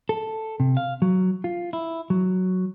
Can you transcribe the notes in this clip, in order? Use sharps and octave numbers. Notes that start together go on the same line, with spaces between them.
A4
C3
F5
F#3
F4
E4
F#3